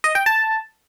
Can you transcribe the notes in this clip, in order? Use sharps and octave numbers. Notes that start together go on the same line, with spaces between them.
D#5
G5
A5